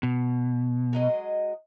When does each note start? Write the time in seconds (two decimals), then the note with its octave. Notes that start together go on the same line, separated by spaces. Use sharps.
0.03 B2
0.93 F#3 G#3 D#5